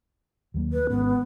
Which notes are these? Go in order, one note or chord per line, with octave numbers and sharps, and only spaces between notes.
D#2 F#3 A#3
B4
G#1 G#2 B3 C#4